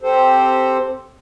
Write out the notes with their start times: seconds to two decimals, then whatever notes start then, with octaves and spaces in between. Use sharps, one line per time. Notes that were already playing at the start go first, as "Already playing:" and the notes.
0.02 C4 G4 A4 C5